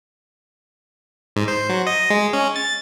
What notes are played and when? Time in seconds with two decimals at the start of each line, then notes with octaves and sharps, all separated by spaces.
1.36 G#2
1.48 C5
1.69 F#3
1.87 D#5
2.10 G#3
2.33 C#4
2.56 A6